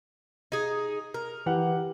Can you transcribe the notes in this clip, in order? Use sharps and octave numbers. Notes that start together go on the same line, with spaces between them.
D#4 G#4
A#4
E3 G4 F#5